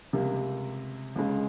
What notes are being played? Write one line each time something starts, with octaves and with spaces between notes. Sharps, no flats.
C#2 C3 G3 A#3
C#2 C#3 G#3